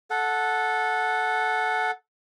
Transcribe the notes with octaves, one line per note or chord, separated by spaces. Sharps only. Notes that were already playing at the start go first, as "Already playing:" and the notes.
A4 F#5